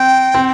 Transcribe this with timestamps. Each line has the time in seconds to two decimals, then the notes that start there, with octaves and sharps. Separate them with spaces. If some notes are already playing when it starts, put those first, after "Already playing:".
Already playing: C4 G5
0.34 C4